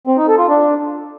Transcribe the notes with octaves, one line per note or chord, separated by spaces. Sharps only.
C4
D#4
A4
F4
D4